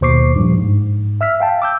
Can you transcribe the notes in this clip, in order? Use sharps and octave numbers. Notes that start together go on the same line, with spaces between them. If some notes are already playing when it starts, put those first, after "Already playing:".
D#2 B2 C5 C#6 D6 C7
G2 A#2 F3
G#2
E5 E6 F6 B6
F5 G5 A5
D6 E6 G6